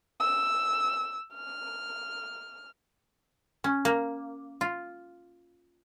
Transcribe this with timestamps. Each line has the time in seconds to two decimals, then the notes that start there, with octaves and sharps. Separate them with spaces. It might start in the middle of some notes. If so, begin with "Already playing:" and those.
0.20 E6
1.34 F6
3.64 C#4
3.85 A#3
4.61 F4